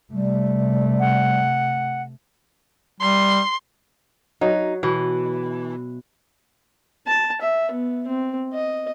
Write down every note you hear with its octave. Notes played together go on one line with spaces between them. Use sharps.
C3 G3 A3
F#5
G3 C6
F#3 D#4
B2 E3
A5
E5
B3
C4
D#5